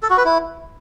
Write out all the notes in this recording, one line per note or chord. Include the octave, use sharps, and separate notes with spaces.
A4
F#4
B4
E4